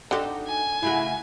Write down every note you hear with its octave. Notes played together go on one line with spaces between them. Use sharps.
D3 D#4 F#4 G4 A4
G#5
C#3 A3 E4 F#4